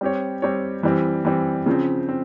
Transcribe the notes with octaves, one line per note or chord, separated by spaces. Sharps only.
G3 C4 G4 C#5
G3 C4 G4 C#5
E3 G3 C4
E3 G3 C4
C#3 F3 C4
C4